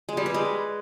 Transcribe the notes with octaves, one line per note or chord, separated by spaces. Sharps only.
G#3
G3
B4
G#3